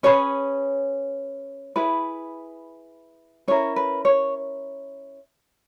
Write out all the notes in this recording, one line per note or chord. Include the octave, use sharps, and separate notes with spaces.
C#4 G#4 B4 C#5
E4 G#4 B4
C#4 E4 A#4 C#5
B4
C#5